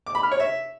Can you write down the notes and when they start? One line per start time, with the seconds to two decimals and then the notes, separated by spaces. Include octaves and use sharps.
0.06 D6
0.15 B5
0.23 F6
0.31 C#5
0.40 E5